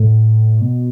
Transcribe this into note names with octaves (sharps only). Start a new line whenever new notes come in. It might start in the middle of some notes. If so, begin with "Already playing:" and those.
Already playing: A2
B2